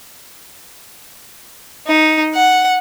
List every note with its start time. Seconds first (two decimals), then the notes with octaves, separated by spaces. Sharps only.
1.87 D#4
2.35 F#5